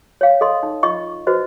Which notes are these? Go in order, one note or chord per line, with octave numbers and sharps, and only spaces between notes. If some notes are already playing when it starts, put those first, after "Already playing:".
C#5 F5
A4 D#5 C6
D#4
F4 D#5 C#6
F#4 B4 C5 D#5